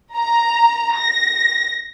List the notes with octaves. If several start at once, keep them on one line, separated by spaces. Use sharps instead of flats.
A#5
A#6